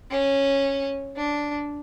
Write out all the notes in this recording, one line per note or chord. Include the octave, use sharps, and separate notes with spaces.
C#4
D4